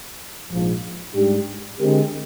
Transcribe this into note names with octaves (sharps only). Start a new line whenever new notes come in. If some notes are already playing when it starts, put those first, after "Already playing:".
A#1 G#2 F3
G#2 G3 D4 G4
D3 G#3 C4 G4 A#4